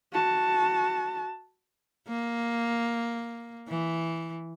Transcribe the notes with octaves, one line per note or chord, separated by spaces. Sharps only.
F#4 A5
A#3
E3